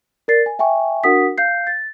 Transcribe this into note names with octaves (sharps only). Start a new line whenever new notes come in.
A#4 D5 A6 C7
G#5
E5 G5 G#5 C#6
D4 F#4 A#4 F#5 D#6 B6
F5 G6 C7
A6